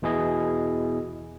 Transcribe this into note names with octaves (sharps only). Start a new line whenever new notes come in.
E2 B2 E4 G#4 D#5